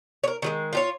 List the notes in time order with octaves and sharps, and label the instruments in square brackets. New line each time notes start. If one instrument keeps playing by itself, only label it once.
[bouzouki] A#4 C#5
D#3 F#3 G#3
F4 G4 C#5